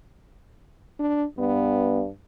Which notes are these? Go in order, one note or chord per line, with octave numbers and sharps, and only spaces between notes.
D4
G2 B3